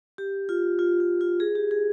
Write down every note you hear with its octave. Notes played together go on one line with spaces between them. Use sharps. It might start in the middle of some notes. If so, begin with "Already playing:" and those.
G4
F4
F4
F4
F4
G#4
G4
G#4